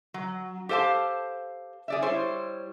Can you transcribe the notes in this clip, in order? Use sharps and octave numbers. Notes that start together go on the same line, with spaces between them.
F#3
G4 A4 C5 F5 A5
G#4 D5 E5
G3 E4 C5 C#5